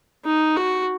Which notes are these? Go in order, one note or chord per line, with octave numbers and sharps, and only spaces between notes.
D#4
F#4